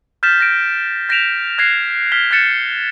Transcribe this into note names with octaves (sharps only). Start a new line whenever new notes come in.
F6 G6 A6 B6 E7
A#6 D7
G6 A#6 B6 D7 E7 F7
F6 F#6 G#6 A#6 C7
F6 B6 G7
F#6 G6 A6 C#7 E7